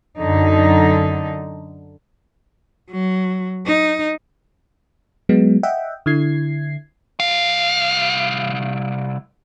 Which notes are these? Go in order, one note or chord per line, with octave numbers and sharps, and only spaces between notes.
F#2 D3 D#4
F#3
D#4
F#3 G#3 B3
D#5 E5 F#5 G5
D3 E4 G#6 C7
C2 F5